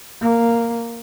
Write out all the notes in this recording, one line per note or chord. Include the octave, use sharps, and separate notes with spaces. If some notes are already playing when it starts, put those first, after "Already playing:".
A#3